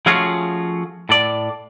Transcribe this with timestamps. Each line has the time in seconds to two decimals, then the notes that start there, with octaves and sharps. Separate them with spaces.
0.06 F3 A3 C#4 F4 F#4 G#4
1.09 A2 A4 D5